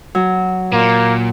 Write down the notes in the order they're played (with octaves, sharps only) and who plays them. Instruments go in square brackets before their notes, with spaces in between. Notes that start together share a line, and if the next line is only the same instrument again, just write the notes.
[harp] F#3
[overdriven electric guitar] A#2 [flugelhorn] A#3